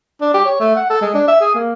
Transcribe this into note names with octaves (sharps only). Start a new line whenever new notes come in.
D4
G4
C#5
A3
F#5
A4
G#3
D4
E5
G#4
A#3